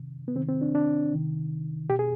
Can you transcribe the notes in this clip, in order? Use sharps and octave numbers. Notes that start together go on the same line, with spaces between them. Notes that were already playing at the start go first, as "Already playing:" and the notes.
Already playing: C3 D#3
B3
C3 D#3 C4
C4
D4
D4
C3 D#3
B2 G4
G#4